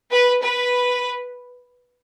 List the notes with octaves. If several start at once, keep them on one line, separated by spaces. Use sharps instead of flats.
B4
B4